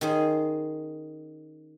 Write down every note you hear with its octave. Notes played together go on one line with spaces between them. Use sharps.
D#3 C#4 G#4 C5